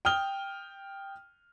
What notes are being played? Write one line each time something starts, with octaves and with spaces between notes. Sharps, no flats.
G5 D#6 F6 G7